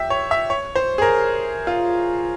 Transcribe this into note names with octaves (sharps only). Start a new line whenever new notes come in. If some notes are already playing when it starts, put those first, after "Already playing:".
Already playing: G4 E5
C#5
E5
C#5
C5
G#4
A#4
F4